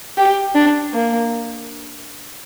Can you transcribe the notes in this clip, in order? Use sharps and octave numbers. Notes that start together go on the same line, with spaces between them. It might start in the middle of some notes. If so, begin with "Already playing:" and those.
G4
D4
A#3